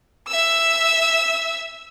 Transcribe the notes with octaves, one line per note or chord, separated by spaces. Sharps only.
E5 E6